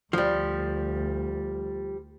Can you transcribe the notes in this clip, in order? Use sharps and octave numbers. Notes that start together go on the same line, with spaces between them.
D2 F3 G3